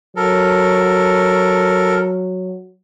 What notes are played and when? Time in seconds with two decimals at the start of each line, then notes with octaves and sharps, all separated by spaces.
0.16 F#3 A4 A#4